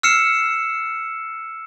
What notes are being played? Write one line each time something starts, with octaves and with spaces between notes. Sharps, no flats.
E6 F6 C7 C#7 E7